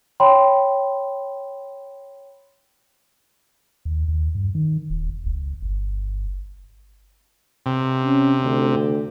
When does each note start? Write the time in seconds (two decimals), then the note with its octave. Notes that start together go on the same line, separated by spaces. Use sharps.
0.20 C#5 G5 B5 C6
3.85 D#2
4.08 D#2
4.35 G2
4.55 D#3
4.90 D#1
5.10 E1
5.26 C#2
5.62 G1
7.66 C3
8.05 C#4
8.42 D2